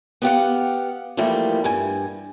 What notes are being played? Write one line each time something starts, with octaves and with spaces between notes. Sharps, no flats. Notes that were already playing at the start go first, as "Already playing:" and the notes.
B3 G4 F5 F#5
E3 F3 G3 A3 A#3
G2 G#5